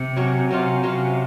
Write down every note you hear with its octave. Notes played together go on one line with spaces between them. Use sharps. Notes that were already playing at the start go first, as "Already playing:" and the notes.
Already playing: C3
F#3 C#4 F#4 C#5
C3 F#3 C#4 F4
C3 F#3 C#4 F4